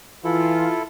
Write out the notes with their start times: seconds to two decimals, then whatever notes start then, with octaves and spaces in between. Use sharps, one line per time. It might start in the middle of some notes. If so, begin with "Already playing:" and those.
0.25 E3 E4 F4 A4